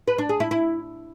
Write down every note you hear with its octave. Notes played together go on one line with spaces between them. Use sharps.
B4
D4
G#4
E4
E4